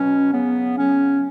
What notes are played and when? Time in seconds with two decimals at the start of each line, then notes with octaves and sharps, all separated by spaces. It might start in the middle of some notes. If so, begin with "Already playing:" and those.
Already playing: B2 F#3 C#4
0.32 C#3 F#3 B3
0.76 C#3 F#3 C#4